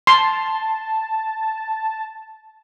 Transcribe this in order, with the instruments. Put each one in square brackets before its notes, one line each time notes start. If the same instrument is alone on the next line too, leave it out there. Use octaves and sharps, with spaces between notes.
[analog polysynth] A5 [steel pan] C6